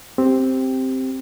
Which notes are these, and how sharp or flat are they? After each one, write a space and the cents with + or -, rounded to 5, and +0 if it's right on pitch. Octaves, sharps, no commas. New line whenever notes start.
C4 +0 G4 +0